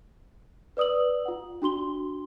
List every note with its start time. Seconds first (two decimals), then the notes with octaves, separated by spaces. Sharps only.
0.77 B4 D5 D#6 E6 F#7
1.25 F4 F#5
1.62 D4 F#4 C6 G7